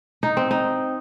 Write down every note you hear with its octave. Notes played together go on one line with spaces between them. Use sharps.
D#4
C4
D#4